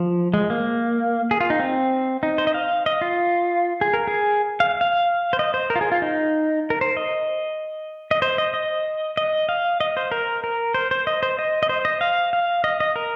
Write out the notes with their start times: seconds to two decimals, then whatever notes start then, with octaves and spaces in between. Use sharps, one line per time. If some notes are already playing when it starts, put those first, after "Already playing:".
Already playing: F3
0.34 G#3
0.50 A#3
1.31 G#4
1.41 F4
1.50 D#4
1.60 C4
2.23 D#4
2.38 C5
2.47 D#5
2.54 F5
2.86 D#5
3.01 F4
3.81 G#4
3.94 A#4
4.07 G#4
4.60 F5
4.81 F5
5.33 C5
5.39 D#5
5.54 C5
5.70 A#4
5.76 F4
5.81 G#4
5.92 F4
6.02 D#4
6.70 A#4
6.81 C5
6.97 D#5
8.11 D#5
8.22 C5
8.38 D#5
8.54 D#5
9.17 D#5
9.49 F5
9.80 D#5
9.97 C5
10.12 A#4
10.44 A#4
10.74 C5
10.91 C5
11.07 D#5
11.23 C5
11.39 D#5
11.63 D#5
11.69 C5
11.85 D#5
12.01 F5
12.33 F5
12.64 D#5
12.80 D#5
12.96 A#4